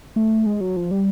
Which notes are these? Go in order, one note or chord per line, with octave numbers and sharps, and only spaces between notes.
A3
G#3
F#3
F3
G3